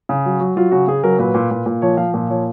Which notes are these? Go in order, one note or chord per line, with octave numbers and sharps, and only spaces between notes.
C#3
F#3
F#3
F#3 F4
C#3 F#4
C#3 G#4
F#3 A#4
A#2 B4
A#2
A#2
A#2
F3 C#5
F3 F5
A#2
F3 C#5